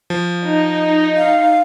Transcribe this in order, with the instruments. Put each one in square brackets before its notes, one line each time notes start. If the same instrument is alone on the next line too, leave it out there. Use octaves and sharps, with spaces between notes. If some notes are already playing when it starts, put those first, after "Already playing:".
[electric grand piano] F3
[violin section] D#4
[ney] F5